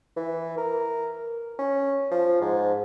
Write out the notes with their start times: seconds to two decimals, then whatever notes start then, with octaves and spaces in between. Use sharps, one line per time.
0.17 E3
0.58 A#4
1.59 C#4
2.11 F3
2.41 G#2